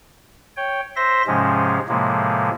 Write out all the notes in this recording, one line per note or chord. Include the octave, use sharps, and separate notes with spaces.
C#5 G5
C5 E5 C6 A#6
G#2 C3 F3 G#3 C#4
A2 C3 F3 G#3 A#3